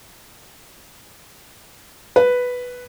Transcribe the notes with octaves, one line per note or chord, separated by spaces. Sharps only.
B4